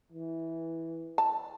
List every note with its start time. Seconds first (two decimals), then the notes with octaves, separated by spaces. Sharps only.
0.12 E3
1.18 A5